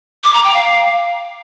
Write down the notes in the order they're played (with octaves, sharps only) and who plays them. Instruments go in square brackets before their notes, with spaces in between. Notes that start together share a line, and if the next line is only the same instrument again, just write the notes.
[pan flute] D6
A#5
G5
F5